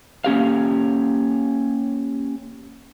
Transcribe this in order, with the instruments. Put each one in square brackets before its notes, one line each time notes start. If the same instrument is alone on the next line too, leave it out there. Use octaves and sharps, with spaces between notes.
[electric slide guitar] A#3 C#4 G4 F5